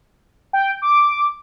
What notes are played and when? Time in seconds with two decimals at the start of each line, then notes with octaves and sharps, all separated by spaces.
0.53 G5
0.82 D6